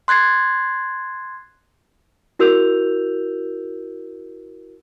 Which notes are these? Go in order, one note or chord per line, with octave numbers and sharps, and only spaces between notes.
C6 F#6 G#6 A6 C7
E4 F#4 A#4 E6 G6 F7